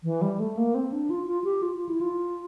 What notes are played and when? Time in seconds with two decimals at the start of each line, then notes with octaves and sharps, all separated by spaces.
0.04 E3
0.22 G3
0.40 A3
0.57 A#3
0.75 C4
0.92 D4
1.10 F4
1.27 F4
1.44 G4
1.63 F4
1.76 F4
1.89 E4
2.01 F4